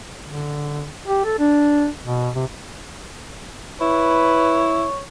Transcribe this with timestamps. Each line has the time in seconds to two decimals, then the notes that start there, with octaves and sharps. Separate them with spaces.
0.25 D3
1.07 G4
1.24 A4
1.39 D4
2.03 B2
2.35 C3
3.81 E4 B4 C#5